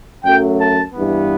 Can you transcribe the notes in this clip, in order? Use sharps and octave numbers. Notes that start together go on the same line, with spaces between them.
F#2 F#3 A3 G5
A5
G2 E3 B3